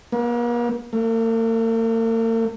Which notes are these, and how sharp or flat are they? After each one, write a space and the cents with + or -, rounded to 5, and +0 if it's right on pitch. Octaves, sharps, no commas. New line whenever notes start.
A#3 +45
A#3 -45